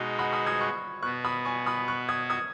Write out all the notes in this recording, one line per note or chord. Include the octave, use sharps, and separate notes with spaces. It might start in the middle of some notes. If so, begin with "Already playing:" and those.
Already playing: B2 G#3 D#4 F#4
F#5 B5
B5 D#6
D#6 G#6
C#6 F#6
B2 B3 F#4 C#6 F#6
B5 D#6
G#5 C#6
B5 D#6
C#6 F#6
D#6 G#6
D#6 G#6